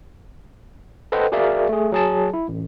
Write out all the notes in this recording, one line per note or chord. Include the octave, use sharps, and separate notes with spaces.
A4 B4 C5 D#5 F#5 G5
F#4 G#4 A#4 D5 E5 F5
A3 G#4
F#3 G#4 A5
E4
A1